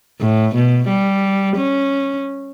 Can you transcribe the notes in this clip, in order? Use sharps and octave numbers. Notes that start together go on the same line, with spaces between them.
A2
B2
G3
C#4